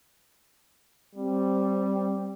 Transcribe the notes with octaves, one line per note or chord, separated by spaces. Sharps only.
G3 C4